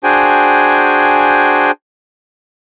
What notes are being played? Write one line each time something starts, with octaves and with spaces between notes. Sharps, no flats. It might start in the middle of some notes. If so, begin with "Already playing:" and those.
D4 F#4 G#4 C5 G5 G#5